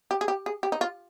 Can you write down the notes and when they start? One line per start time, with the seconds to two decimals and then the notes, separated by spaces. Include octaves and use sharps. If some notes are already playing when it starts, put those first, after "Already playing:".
0.11 G4
0.21 G#4
0.28 G4
0.46 G#4
0.63 G4
0.72 D#4
0.81 F4